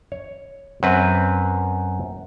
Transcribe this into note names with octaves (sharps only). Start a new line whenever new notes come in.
C#5
F#2 C4 B4